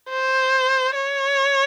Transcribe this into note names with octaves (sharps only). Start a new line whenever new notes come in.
C5
C#5